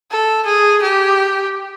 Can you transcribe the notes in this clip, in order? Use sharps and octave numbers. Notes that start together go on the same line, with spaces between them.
A4
G#4
G4